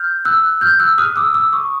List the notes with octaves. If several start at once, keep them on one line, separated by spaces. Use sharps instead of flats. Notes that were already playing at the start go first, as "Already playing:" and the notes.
Already playing: F6 G6
E6 F#6
F6 G6
E6 F#6
D#6 F6
D6 E6
D6 E6
C#6 D#6